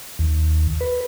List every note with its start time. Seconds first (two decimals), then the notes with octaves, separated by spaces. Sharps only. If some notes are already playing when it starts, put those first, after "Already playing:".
0.19 D#2
0.81 B4